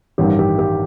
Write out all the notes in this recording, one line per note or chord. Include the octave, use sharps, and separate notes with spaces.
A1 G2 D#3 G4
G4
G4